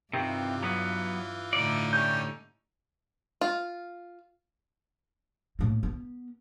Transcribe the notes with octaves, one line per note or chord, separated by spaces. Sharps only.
G2 C3 D#3 E3 C4 F4
F#3 B3
A2 D3 D#4 D5
G3 A3 C#4 G6
F4
A2 A#3
B3